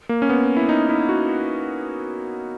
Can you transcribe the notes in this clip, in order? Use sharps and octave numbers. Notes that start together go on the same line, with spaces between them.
A#3
C#4
B3
E4
D#4
E4
F#4